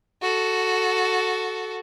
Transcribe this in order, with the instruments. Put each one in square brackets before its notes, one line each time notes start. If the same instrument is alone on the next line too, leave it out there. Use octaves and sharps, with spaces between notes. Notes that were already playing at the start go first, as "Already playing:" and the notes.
[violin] F#4 A4